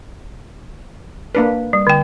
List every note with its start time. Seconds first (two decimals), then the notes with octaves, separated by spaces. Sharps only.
1.35 A#3 D4 B4
1.73 G3
1.87 D3 G5